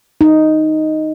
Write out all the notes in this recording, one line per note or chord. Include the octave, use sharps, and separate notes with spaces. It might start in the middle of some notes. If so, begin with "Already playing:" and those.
D#4